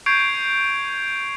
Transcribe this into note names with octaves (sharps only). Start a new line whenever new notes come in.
C#6 G6 G#6 C7 D7 F7